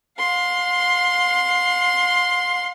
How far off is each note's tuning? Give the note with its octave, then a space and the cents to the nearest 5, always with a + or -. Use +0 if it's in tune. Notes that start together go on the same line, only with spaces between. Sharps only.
F5 +40 C6 +0